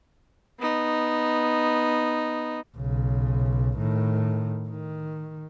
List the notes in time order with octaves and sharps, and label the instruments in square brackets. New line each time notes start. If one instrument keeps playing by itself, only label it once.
[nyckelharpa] B3 D#4
[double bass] B1 C#3
A2 D#3
D#3